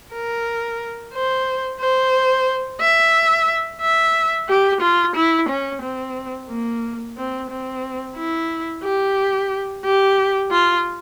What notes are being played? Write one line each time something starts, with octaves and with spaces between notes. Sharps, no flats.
A#4
C5
C5
E5
E5
G4
F4
E4
C#4
C4
A#3
C4
C4
E4
G4
G4
F4